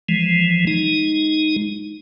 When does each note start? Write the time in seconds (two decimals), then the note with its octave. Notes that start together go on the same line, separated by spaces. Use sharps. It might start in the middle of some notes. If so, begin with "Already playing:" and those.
0.09 E3 F3 G#3
0.67 G#3 D#4